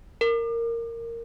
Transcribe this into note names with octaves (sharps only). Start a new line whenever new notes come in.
A#4